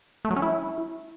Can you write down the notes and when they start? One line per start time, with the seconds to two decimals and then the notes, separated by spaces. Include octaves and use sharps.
0.25 A3
0.30 F#3
0.36 C#4
0.42 E4